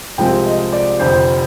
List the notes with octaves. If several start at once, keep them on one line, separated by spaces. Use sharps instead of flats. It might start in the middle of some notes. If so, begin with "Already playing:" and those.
C2 C3 F3 G#3 C4 G5
D#5
D5
F1 F2 D3 C5